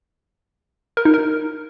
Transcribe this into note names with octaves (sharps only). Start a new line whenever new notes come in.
A#4
D#4
A#4